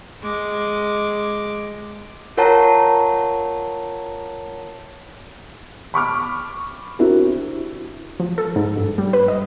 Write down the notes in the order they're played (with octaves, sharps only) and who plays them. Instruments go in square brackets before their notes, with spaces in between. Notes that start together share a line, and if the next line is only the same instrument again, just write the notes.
[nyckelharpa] G#3 D6
[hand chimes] F4 A#4 C#5 F#5 A5 A#5
[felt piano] B5 C#6 D6 F6
C4 D4 E4 F#4 G4 A#4
[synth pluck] F3
A4
G#2
G2
G3
B4
D#5